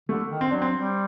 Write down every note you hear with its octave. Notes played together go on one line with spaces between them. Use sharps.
D3 A3
D#3
C4
F#3 D4
C4
G3